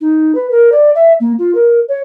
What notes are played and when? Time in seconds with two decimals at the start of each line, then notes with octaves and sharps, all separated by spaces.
0.01 D#4
0.35 B4
0.51 A#4
0.72 D5
0.95 E5
1.20 A#3
1.38 F4
1.55 A#4
1.88 C#5